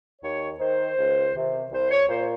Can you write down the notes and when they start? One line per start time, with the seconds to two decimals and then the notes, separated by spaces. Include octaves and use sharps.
0.22 D#2 C#5
0.59 D#3 C5
0.97 C#2
1.35 C3 D#3
1.71 C2 C5
1.91 C#5
2.09 A#2 C5